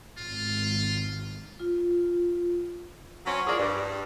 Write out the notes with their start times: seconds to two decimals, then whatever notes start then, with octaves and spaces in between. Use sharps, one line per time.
0.18 G#1 F4
1.60 F4
3.26 F#3 C4 C#4
3.46 E3 F3 A#3 G#4 D5
3.59 G2